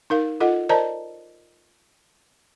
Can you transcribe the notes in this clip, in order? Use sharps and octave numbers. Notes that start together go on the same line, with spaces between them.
D#4 A#4 F5
F4 A4 D#5 F#5
A#4 C5 D5 D#5 A5 A#5